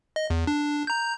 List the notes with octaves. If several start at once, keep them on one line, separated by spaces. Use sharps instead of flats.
D#5
E2
D4
A#5 G6